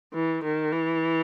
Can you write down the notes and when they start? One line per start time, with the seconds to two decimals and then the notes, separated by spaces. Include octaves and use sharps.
0.14 E3
0.44 D#3
0.72 E3